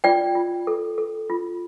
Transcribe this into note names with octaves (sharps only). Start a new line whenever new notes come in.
F4 D5 G5
F4
A4
A4
F4